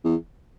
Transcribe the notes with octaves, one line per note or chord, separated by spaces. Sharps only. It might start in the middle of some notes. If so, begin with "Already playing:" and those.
E2